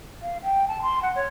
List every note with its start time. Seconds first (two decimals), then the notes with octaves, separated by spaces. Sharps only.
0.22 F5
0.43 G5
0.68 A5
0.82 C6
1.02 F#5
1.15 C#5